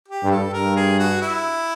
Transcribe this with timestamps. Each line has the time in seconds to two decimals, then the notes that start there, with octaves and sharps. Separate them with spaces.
0.08 G4
0.23 G2
0.31 A4
0.53 G2 A#4
0.76 G#4
0.99 F#4
1.22 E4